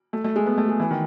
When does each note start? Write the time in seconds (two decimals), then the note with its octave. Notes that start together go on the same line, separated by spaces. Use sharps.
0.13 A3
0.24 A3
0.36 G#3
0.46 B3
0.58 A3
0.69 G#3
0.80 E3
0.91 D#3